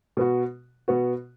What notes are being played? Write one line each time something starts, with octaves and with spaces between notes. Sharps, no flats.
B2 B3 F#4
B2 B3 F#4